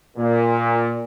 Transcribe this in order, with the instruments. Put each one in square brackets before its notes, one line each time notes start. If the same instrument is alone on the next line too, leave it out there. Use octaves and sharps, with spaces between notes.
[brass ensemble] A#2